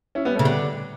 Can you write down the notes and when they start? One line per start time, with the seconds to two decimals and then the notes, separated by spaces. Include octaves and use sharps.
0.15 C#4 E4
0.25 G3 B3
0.35 A3 C#4
0.39 C#3
0.44 D3 G3 B3